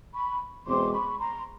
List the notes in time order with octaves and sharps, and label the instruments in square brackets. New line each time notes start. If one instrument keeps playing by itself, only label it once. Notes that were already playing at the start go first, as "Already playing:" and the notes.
[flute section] B5 C#6
[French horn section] E2 B2 G#3 C4 [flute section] C6 D6
[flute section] B5 C#6
A#5 C6